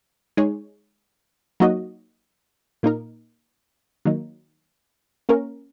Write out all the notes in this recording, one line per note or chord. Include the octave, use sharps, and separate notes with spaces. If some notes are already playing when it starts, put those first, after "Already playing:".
G#3 D#4 G#4 C#5
F#3 A#3 D#4 F#4 D#5
A#2 A#3 D#4 A#4
D#3 F#3 A#3 D#4
A#3 C#4 A#4